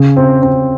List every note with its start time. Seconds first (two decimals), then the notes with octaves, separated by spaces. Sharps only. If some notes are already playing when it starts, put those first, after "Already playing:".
Already playing: C#3
0.16 C4
0.42 C4